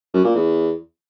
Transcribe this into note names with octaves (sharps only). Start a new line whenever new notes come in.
F#2
A#2
E2